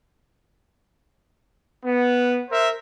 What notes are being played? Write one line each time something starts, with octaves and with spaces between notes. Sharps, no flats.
B3
A#4 C5 E5